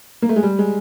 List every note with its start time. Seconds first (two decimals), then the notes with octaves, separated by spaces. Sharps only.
0.22 A#3
0.29 A3
0.36 G#3
0.43 G3
0.59 G#3